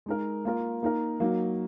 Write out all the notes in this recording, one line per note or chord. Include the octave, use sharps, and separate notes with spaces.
G#3 D#4 A#4
A#3 F4 A#4
A#3 D#4 A#4
F#3 A#3 D#4 F#4